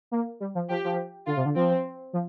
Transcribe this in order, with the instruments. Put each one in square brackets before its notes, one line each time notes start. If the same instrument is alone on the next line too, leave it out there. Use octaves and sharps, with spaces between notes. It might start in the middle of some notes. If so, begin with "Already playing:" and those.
[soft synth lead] A#3
G3
F3
[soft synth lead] F3 [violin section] G4
[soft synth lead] F3
[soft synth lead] D3 [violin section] F4
[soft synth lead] C3
D3
[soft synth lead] F3 [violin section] C4
[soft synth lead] F3